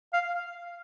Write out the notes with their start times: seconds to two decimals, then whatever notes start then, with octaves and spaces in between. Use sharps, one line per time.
0.13 F5